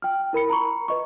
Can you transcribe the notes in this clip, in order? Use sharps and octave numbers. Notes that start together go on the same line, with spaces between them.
G5 F6
E4 A#4 B5 C#7
A#5 B5 C#6 C#7
B4 D#5 C#6